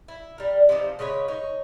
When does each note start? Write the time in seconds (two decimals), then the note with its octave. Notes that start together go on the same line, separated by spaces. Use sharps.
0.08 E4
0.38 G3 A#4
0.69 C3 E3 F3 D#4
0.99 C#3 G#3 B4 C#5
1.28 D#4 C#5